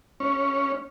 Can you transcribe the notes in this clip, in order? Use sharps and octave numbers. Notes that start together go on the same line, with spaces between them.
C#4